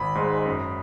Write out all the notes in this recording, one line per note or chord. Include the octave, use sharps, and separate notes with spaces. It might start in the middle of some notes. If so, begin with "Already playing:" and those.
Already playing: G#1 B5
G#2 G#3
F#2